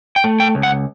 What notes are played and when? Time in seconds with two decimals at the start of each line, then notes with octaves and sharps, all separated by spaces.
0.16 G5
0.24 A3
0.40 G5
0.55 C#2
0.63 F#5